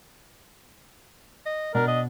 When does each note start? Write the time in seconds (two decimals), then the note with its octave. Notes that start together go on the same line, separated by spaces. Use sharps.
1.46 D#5
1.75 B2 D4 A#4
1.88 D#5